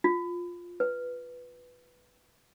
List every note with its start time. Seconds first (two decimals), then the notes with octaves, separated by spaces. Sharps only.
0.04 F4
0.80 B4